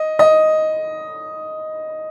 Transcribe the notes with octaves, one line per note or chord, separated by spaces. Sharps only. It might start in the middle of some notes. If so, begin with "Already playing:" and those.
Already playing: D#5
D#5